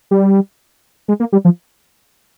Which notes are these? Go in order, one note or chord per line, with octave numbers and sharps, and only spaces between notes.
G3
G#3
A#3
G3
F3